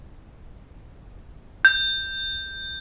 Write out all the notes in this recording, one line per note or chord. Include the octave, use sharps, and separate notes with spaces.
G6